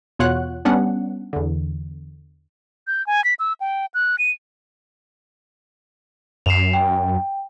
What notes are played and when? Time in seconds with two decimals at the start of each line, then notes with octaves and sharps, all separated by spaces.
0.19 E2 B2 F4 C#5 F#5 F#6
0.65 G3 B3 C#4 D4 F#5
1.33 E2 D3
2.87 G6
3.07 G#5
3.24 B6
3.39 E6
3.61 G5
3.94 F#6
4.19 D#7
6.46 F#2 C7 E7 F7
6.73 G5